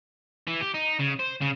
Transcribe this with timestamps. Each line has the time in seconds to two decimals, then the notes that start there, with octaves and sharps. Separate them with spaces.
0.48 E3
0.61 G4
0.75 D#4
1.00 C#3
1.20 C5
1.41 C#3